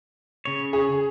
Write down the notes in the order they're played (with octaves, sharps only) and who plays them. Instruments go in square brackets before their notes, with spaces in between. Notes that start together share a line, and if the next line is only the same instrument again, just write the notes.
[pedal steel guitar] C#3 C#5
[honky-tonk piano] G#4